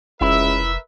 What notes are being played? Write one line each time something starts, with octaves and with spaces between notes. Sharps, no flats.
F1 C#2 E4 A#4 B4 E5